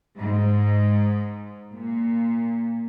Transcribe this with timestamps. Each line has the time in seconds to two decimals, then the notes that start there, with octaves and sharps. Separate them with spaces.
0.16 G#2
1.74 A#2